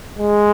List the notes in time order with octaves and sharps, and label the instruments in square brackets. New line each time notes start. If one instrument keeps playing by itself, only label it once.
[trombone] G#3